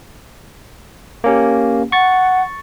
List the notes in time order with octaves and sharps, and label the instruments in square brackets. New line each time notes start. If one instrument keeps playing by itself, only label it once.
[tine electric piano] A#3 C#4 G4
[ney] F#5 [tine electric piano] C#6 A6